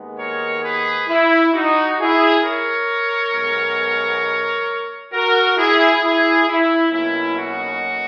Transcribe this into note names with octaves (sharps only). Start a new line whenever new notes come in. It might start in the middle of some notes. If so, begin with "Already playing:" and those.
Already playing: D#2 D#3 G#3 B3
A#4 C#5
G#4 B4
E4
D#4 F#4
E4 G#4
A#4 C#5
B1 B2 G#3 B3
F#4 A#4
E4 G#4
E4 G#4
E4
B1 B2 A#3 C#4 E4
D#4 F#4